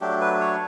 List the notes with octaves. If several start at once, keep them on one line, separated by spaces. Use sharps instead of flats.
F#3 A3 D4 G4
B4
C#5